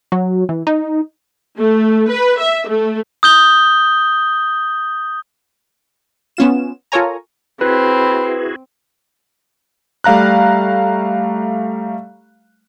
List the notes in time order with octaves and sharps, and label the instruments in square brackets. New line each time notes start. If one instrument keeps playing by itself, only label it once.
[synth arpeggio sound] F#3
E3
D#4
[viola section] A3
B4
E5
A3
[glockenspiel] D#6 G6 G7
[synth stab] B3 C#4 F4 E7
F4 A4 A#4 C#5 G#5 A#5
[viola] C4 [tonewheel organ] E4 F#4 G#4 [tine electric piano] B4 [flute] B5
[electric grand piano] G3 A3 F5 A#5 F#6